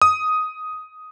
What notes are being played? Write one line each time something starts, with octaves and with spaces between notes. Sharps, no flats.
D#6